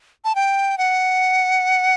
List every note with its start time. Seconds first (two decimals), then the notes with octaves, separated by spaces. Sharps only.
0.25 A5
0.35 G5
0.78 F#5